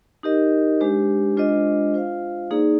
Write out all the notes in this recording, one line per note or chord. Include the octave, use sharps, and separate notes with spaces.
D#4 G4 A#4 D#5
G#3 D4 G4 C5
G#3 D4 F4 C5 D#5
F4 C5 F5
A#3 D#4 G#4 D5